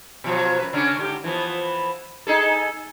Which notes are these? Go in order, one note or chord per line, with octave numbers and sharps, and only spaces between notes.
B2 F3 F#3
F#2 B4
C#3 C#4 D4
G#2 D3 G4
E3 F3 B3
D#4 G#4 A4